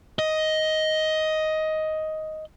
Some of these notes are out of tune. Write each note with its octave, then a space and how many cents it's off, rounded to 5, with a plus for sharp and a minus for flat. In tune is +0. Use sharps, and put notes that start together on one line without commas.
D#5 +10